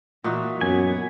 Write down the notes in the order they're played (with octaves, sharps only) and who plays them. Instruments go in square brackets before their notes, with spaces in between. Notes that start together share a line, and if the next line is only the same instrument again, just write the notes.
[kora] A#2 D#4 F#4 [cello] E3
[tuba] F#2 [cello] B3 [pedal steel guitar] G#5